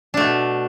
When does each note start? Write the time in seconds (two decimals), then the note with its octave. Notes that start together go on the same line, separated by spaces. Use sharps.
0.14 D4
0.17 A3
0.21 B2